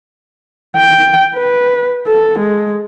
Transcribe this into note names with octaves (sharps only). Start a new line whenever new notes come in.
G5
B4
A4
G#3